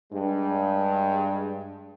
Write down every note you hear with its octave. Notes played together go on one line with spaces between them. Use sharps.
G2 G#3